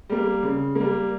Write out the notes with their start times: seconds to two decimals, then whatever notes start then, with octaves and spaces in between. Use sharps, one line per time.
0.10 G3 A#3
0.43 C#3
0.75 G3 A#3